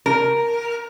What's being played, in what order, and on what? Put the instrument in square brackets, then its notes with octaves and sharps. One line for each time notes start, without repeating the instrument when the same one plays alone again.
[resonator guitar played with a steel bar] A#4